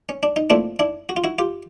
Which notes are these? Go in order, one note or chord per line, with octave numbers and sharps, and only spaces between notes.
C#4
D4
D#4
A#2 F3 A3 C4 D4 E4
D4 E4
F#4
F4
E4 F#4
F4 G4